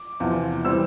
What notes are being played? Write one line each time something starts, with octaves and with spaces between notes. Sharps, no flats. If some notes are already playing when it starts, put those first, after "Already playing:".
Already playing: D6
E2 C3 F3
E3 G3 C4 E6